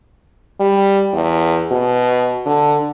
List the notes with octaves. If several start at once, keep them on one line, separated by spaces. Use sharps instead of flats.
G3
E2
B2
D3